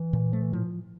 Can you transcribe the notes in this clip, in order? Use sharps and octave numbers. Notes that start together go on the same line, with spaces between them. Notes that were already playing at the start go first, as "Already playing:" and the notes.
Already playing: E3
A#2
F3 A3
E3
A2 F3